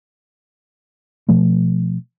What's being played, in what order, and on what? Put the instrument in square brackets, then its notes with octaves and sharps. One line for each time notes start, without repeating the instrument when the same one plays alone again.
[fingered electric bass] B2 F3 A3